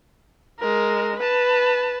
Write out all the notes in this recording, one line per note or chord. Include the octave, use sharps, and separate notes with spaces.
G#3 A#4
B4 A5